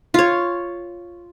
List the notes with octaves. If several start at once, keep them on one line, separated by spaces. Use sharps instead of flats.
F4 C#5